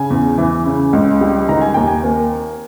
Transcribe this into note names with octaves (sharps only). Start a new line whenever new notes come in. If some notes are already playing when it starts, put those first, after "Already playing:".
Already playing: C#3 G#5
E2
E3
C#3
C#2
G3
D#3 A#5
G#5
D#2 G5
G#5
A#3